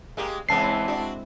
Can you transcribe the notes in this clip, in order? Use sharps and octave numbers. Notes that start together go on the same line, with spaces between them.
G#3 A#3 G4
C#3 E3 G#3 B3 C4 E4 A5 C7
D4 F#4